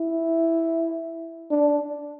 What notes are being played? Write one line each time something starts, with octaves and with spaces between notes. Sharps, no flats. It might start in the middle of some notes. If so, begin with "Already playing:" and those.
Already playing: E4
D4